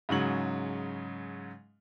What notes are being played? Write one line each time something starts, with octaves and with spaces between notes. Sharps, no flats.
G#2 C#3 F#3 F#7